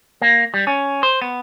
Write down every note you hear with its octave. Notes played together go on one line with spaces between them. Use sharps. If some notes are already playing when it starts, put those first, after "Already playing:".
A#3
G3
C#4
C5
B3